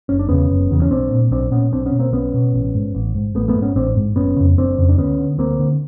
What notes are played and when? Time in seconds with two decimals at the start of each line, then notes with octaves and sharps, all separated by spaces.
0.09 F#1 C#4
0.19 D4
0.29 E2 C#3 B3 C#4
0.50 F#1
0.71 E2 C#3
0.82 C#4
0.91 B1 C4 D4
1.11 A#2
1.31 B1 C4 D4
1.51 A#2 B3 C#4
1.73 B1 C4 D4
1.86 B3 C#4
1.92 B2
1.99 A#3 C4
2.12 B1 B3 C#4
2.34 B2
2.54 A1
2.75 G#2
2.95 A1
3.15 G#2
3.35 A1 A3 B3
3.48 A3 B3
3.55 G#2
3.62 B3 C#4
3.76 A1 C4 D4
3.96 G#2
4.16 F#1 B3 C#4
4.36 F2 C#3
4.57 F#1 C4 D4
4.78 F2 C#3
4.89 D4
4.98 D2 B3 C#4
5.19 D3
5.38 D2 A#3 C4
5.59 D3